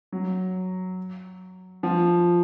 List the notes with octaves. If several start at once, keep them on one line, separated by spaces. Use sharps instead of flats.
F#3
F3